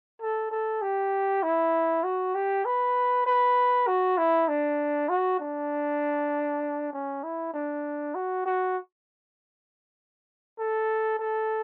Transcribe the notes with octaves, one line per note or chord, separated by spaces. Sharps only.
A4
A4
G4
E4
F#4
G4
B4
B4
F#4
E4
D4
F#4
D4
C#4
E4
D4
F#4
F#4
A4
A4